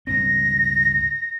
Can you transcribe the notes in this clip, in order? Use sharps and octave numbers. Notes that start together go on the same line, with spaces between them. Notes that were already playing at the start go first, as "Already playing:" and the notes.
C#2 G2 C4 A#6